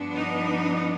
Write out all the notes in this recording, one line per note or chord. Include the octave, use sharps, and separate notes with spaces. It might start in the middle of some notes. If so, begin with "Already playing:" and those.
Already playing: G2 F3 B3 D4
D#4